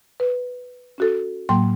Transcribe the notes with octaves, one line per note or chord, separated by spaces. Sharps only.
B4
C#4 F#4 A4
A2 F#3 A#3 G5 C6